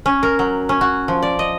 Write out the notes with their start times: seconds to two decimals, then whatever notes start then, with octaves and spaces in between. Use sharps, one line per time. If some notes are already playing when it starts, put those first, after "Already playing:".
0.06 C#4
0.23 A#4
0.39 F#3
0.69 C#4
0.81 F#4
1.08 F3
1.22 D5
1.39 D#5